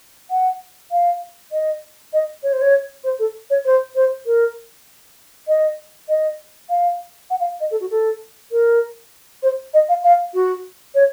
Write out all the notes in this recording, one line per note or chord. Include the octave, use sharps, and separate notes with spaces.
F#5
F5
D#5
D#5
C#5
C5
C#5
C5
A4
C#5
C5
C5
A#4
D#5
D#5
F5
F#5
F5
D#5
A4
F#4
A4
A#4
C5
D#5
F5
F5
F#4
C#5